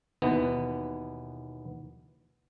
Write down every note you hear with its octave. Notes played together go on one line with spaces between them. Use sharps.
D#2 B2 E3 B3